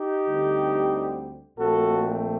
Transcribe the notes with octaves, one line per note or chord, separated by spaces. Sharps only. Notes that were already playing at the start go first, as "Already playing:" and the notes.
Already playing: D#4 G4
D2 D3 G3 C4
A#1 A#2 A3 C4 F#4 A4